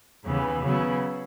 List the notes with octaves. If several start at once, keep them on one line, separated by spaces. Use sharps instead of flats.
D#2 C#3 E3 B3
C#3 F#3 B3 E4